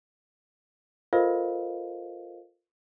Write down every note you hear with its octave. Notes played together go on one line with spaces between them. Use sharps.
F4 A4 A#4 C5 D#5 F5